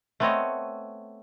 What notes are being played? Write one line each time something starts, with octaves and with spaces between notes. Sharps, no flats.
A3 B3 C4 A4 C#5 D#5